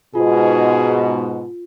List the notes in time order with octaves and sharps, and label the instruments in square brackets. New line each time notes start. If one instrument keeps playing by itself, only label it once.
[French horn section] G#2 B2 [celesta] F4 [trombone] G#4